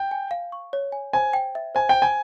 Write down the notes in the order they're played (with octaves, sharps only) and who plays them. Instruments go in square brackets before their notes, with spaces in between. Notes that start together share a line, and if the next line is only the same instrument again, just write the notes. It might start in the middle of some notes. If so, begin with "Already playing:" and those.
Already playing: [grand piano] G5
[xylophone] G#5
F5
C#6
C#5
G#5
[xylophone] C5 [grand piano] G#5
[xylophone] G5
E5
[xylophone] C5 [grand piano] G#5
[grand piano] G5
[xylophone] C5
[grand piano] G#5